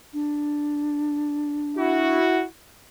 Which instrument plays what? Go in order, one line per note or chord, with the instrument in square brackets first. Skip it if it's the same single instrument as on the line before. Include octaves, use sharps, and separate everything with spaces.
[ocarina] D4
[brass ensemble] E4 F#4